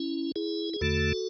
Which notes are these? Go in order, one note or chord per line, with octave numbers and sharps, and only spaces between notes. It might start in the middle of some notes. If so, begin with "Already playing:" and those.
Already playing: C#4 E4
E4 G#4
G#4
E2 D3 A3 F#4 A4